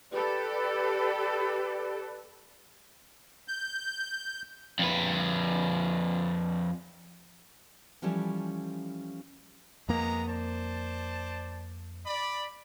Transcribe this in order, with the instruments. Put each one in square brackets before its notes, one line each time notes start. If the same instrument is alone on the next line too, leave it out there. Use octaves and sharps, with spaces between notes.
[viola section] G4 A4 [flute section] B4 D5
[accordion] G6
[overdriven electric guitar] F2 B4
[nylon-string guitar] E3 F3 G3 A3 C#4 E4
[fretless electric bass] F2 A#3 [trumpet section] G#3 B3 A#5
[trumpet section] C5 D5 A5
D5 B5